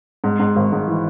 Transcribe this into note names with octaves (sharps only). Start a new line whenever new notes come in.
G#2
G#2
G#1
G#2
E3